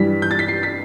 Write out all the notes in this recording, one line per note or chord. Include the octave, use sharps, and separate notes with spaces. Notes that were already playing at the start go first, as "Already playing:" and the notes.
Already playing: G2 E3 G3 B6
G6
A6
B6
C7
B6